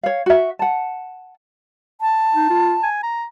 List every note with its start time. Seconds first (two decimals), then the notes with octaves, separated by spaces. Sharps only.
0.03 C#5 F5
0.26 F#4 E5
0.59 F#5 A5
2.01 A5
2.34 D#4
2.50 F4
2.83 G#5
3.03 A#5